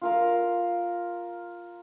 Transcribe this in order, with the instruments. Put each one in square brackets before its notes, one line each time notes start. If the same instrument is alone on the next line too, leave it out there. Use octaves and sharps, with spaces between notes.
[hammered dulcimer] F4 A#4 F5